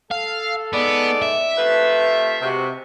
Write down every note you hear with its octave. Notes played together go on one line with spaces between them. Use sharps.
A4 F5
G#3 B3 D#4 D5
E5
C3 F3 A3 B4
C3 G#3 C4 F#4